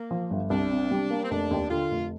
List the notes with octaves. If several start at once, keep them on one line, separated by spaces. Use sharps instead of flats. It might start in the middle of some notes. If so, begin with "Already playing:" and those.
Already playing: A#3
F3
G1
C2 D4
C3
G3
A#3
C4
F1 D4
D#2
D3 F4
F1